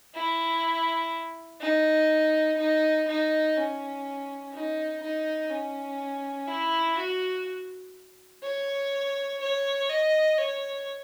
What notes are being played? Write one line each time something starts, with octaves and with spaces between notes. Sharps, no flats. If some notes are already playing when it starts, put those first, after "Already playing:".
E4
D#4
D#4
D#4
C#4
D#4
D#4
C#4
E4
F#4
C#5
C#5
D#5
C#5